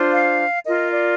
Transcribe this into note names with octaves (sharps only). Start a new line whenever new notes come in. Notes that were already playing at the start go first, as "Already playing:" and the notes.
Already playing: D4 F4 C5
F5
F4 A#4 D#5
D5